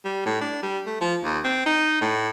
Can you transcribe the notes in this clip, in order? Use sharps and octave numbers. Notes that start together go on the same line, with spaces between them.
G3
A2
D4
G3
A3
F3
D#2
C4
D#4
A2